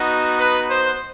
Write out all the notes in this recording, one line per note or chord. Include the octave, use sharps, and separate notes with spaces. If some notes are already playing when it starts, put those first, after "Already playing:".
Already playing: B3 D#4 F#4
B4
C5